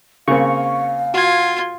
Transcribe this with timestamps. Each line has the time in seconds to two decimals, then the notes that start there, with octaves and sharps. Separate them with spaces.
0.28 C#3 A#3 C4 F5 C#6
1.14 F4 F#4 G#6